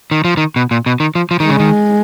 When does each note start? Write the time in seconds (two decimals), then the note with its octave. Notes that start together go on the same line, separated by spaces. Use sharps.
0.11 D#3
0.25 F3
0.37 D#3
0.56 B2
0.71 A#2
0.86 B2
1.00 D#3
1.15 F3
1.31 F3
1.40 D#3
1.45 C#3 G#3
1.60 D#3